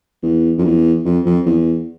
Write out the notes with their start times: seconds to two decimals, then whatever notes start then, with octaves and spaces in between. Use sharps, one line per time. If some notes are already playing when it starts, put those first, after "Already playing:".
0.23 E2
0.58 F2
0.65 E2
1.05 F2
1.26 F2
1.46 E2